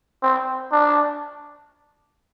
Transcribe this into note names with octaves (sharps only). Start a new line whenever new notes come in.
C4
D4